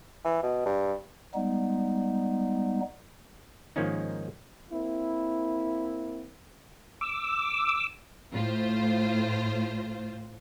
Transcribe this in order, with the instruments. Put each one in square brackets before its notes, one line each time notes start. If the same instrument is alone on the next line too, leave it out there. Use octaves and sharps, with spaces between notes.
[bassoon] E3
B2
G2
[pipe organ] G3 G#3 B3 D#4
[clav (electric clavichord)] G#2 D#3 F3 A#3 C#4 D#4
[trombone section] A#3 C4 E4
[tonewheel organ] D6 E6
[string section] A2 F4 C5